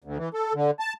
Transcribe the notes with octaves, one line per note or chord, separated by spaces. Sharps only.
D2
E3
A4
D3
A5